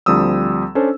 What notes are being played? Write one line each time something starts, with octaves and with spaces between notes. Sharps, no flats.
D2 F3 G3 C4 D#6 E6
C#4 D4 A4 C5